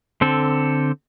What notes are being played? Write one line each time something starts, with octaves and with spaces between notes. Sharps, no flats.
D3 C4 A4